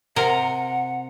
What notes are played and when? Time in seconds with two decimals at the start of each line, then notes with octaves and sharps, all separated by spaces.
0.16 C3 A#4 F#5